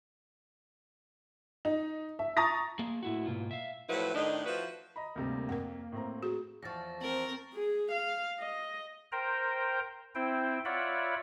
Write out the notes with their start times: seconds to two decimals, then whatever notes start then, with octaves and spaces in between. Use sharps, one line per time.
1.65 D#4
2.19 E5
2.37 A#5 C#6 D#6 A6 A#6
2.79 A#3 G#4
3.03 A2 E4 F#4
3.26 G#2 B2 A#3 F4
3.51 E5 F5
3.89 A2 F3 F#3 E4 B4
4.15 A2 D#3 D4 D#4
4.46 F3 E4 F#4 B4
4.96 D#5 A#5 B5
5.16 D2 C3 G3 A#3
5.49 F2 A#4 F#5
5.92 A2 C4 A#5
6.23 F#4 G#4
6.63 E2 F3 C#6 A6 A#6
7.01 C4 A#4 F#7
7.54 G#4
7.92 F5
8.40 D#5
9.12 A#4 C5 G5 A#5
10.15 C4 E4 C5 G5
10.65 F4 C#5 D5 E5 F#5 B5